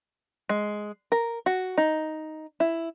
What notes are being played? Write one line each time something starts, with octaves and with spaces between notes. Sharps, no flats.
G#3
A#4
F#4
D#4
E4